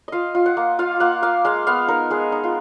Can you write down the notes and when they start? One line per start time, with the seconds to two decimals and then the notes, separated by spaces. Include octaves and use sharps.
0.08 F4 D#5 F5
0.35 F4
0.46 F#5
0.57 A#3
0.79 F4 F5
1.00 A#3 F#5
1.22 A#3 F5
1.45 G#3 F5
1.67 B3 F5
1.88 D#4 A#4
2.10 G#3 G#4
2.32 D#4
2.44 F4